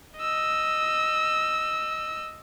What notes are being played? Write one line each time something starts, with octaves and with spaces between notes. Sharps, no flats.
D#5 E6